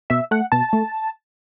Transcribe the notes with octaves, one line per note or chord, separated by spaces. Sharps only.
B2 E5
A3 F#5
B2 A5
A3